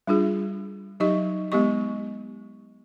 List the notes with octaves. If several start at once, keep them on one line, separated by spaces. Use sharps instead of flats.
G3 D4 F4 G#4
F#3 D#4 G4 D#5 C#6
G#3 B3 G4 D#5 C#6